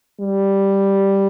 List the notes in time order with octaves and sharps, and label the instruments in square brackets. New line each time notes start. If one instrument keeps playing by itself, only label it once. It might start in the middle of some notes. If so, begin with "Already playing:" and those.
[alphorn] G3